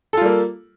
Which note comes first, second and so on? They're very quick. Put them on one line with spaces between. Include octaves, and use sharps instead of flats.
A4 F4 G3 A#3